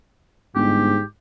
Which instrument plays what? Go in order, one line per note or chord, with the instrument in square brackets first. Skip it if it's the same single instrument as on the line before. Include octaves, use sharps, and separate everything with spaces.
[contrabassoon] G1 [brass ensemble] G#2 [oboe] G4